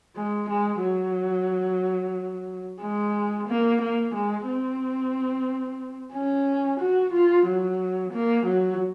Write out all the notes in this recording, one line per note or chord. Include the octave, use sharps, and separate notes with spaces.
G#3
G#3
F#3
G#3
A#3
A#3
G#3
C4
C#4
F#4
F4
F#3
A#3
F#3